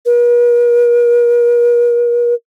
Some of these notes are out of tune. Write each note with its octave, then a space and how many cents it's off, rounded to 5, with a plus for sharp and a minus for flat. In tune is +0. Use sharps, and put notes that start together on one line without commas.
A#4 +45